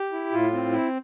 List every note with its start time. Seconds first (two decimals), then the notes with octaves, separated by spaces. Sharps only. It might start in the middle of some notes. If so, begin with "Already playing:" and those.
Already playing: G4
0.12 E4
0.32 A2 F4
0.53 C4
0.72 E4